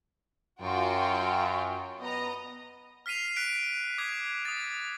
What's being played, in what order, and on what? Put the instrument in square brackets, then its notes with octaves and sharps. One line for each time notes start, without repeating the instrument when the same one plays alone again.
[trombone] F#2 [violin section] F4 F#4 G5
[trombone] B3 [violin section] D#5 A#5
[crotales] F6 B6 C7 D#7 F7
F#6 B6 D7
D6 D#6 G#6 B6
D#6 A6